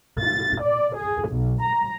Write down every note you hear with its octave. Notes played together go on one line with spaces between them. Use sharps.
A6
D5
G#4
B1
A#5